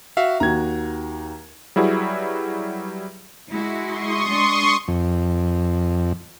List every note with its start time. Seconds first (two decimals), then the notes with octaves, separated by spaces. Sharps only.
0.17 F#4 E5 F5
0.40 D#2 F#4 A#5 G#6
1.76 F#3 G3 E4 F#4 G#4 B4
3.50 G#3 E4 F#4
3.84 C6 C#6 D#6
4.27 G#3 D4
4.88 F2